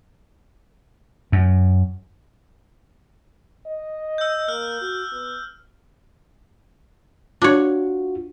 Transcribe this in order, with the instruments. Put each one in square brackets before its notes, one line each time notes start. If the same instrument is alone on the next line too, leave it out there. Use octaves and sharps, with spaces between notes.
[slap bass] F#2
[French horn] D#5
[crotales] E6 G6
[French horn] A#3 [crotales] F6
[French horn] F#4
B3
[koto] D4 C#5 [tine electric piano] F4 F#4